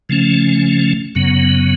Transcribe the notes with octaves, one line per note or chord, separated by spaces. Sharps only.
C#3 F3 A3 C#4
F#2 C#3 F#3 B3